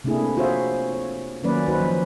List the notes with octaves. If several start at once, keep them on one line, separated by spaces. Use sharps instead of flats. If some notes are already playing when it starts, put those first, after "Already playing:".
C3 A3 A#3 D4 E4 G#4
F4 F#4 G#4 C5 C#5 E5
C#5
D#3 F#3 A#3 C#4 B4 D5
D#4 F#4 B4 C5
F3